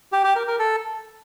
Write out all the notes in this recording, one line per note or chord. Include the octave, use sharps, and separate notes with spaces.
G4
G4
A#4
A#4
A4